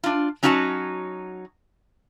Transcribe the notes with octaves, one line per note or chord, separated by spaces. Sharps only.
D4 F4
F#3 C#4 D#4 F#4 F#5 A5